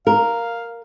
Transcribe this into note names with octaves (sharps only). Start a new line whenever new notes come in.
A#4 F5